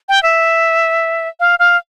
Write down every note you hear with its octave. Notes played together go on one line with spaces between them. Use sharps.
G5
E5
F5
F5